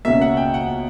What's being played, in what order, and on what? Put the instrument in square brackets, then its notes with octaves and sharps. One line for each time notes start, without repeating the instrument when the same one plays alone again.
[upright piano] C#2 B2 A#3 C#4 [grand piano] E5
[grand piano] F#5
G5
F#5